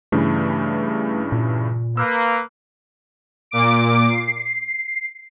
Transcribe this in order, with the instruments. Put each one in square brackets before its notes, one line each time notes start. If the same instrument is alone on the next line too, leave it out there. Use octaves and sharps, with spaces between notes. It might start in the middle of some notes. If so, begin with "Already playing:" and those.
[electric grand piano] G2 C#3 E3 [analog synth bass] A3
[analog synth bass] A#2
[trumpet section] A#3 B4 [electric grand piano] E6
[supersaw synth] A#2 D6 D7
C7